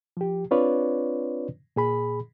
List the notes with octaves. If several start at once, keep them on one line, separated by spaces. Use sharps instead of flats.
F3 G4
C4 D4 F4 B4 C#5 D5
A#2 G#4 B5